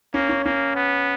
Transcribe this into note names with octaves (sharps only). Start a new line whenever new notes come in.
A#3 C#4
C#4
A#3 C#4
B3